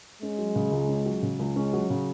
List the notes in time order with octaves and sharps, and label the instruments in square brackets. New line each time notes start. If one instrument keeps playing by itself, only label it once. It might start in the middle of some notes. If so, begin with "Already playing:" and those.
[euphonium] G#3 [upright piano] C#4
[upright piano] F#3
C#3
C#2
C#4
F#3
C#3
C#2
[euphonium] G#3 [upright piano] C#4
[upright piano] F#3
C#3